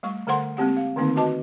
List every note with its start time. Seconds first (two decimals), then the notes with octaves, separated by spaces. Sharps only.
0.03 G3 A3 C#6
0.27 D3 A3 A4 C5 F#5 C6
0.57 G#3 A#3 C4 G4 F#5
0.77 F5
0.96 D3 D#3 A3 A#3 C4 D#4
1.16 F#4 B4 D#5 A5 D6